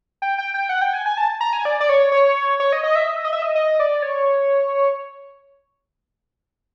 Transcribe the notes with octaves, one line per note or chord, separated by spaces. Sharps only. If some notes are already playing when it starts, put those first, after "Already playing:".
G5
G5
G5
F#5
G5
G#5
G#5
A5
A#5
G#5
D5
D5
C#5
C#5
C#5
D#5
D#5
E5
D#5
E5
D#5
E5
D#5
D#5
D5
C#5